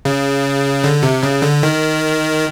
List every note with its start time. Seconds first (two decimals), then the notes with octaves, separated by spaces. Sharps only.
0.05 C#3
0.84 D3
1.03 C3
1.23 C#3
1.42 D3
1.63 D#3